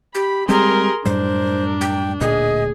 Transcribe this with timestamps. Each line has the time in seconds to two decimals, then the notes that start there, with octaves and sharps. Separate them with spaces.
0.15 G4 B5
0.49 G3 G#3 C4 G4 G#4 A#4 C6
1.05 F#2 A2 G3 D4 A#4 C5
1.81 G5
2.21 D1 D2 A#2 G#4 D#5